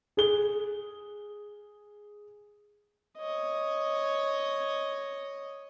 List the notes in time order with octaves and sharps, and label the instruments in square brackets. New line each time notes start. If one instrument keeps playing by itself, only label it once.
[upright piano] G#4 G7
[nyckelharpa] C#5 D#5